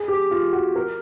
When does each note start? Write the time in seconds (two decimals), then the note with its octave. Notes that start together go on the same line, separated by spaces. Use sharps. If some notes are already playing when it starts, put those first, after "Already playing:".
Already playing: G#4
0.08 G4
0.31 F4
0.53 F#4
0.76 A#4